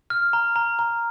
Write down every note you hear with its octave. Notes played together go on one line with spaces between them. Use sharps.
F6
A#5
A#5
A#5